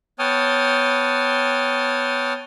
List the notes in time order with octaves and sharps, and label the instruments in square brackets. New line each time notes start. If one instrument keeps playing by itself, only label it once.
[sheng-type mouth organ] B3 C#5 G5 A5 D#6 F6